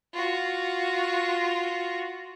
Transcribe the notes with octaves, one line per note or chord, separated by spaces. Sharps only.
F4 F#4